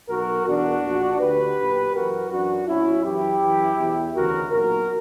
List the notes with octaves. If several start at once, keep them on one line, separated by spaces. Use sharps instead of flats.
B1 B2 F#4 A#4
E2 B2 D4 F#4
A#1 A#2
D2 D3 G4 B4
B1 A#2
F#2 E3 F#4 A#4
F#2 E3 D4 F#4
B1 A#2 C#4 E4
F#2 E3 E4 G4
F#2 E3
E2 B2
D2 C#3 E3 F#4 A#4
B1 A#2 F#4 A#4